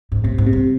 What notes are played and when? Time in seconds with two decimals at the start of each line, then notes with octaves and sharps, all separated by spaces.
0.12 G#2
0.24 A2 C3
0.38 G#2
0.47 C3
0.53 G2